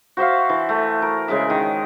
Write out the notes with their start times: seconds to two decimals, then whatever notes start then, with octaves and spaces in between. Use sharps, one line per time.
0.17 F#4 C5 E5 F5
0.49 E3
0.69 A3
1.02 A#4
1.28 C#3 G#3 A#4 E5
1.50 D#3